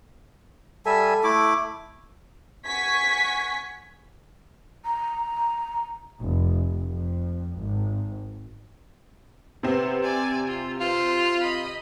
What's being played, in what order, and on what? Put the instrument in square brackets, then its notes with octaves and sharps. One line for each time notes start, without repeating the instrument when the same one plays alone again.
[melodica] G3 E5 G#5 [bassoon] A4
[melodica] A3 E4 D6
[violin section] F#5 G#5 C#6 G#6 B6
[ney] A#5
[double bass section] F1
F2
G#1
[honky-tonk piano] C3 C4 [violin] B3
[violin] D5 G#5
F4
[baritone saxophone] F4 [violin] C5
[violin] D#5 B5